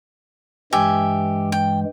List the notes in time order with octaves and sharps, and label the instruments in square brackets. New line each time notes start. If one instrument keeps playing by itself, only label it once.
[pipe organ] G2 E3 G#3 [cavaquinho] G4 E5 G#5
[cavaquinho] G5